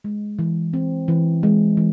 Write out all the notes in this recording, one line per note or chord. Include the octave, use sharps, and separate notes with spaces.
G#3
E3
C4
E3
G#3
E3